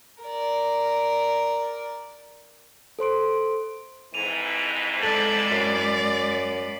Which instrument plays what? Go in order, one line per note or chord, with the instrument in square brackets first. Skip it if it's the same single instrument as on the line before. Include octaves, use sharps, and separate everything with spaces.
[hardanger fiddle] A#4 D5
[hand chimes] A4 C5 C6 D7
[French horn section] F2 G#2 E3 [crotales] D#7 F7
[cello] G#3 D5 [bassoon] A4 [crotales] A6 F#7
[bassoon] F#2 [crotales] B6 C7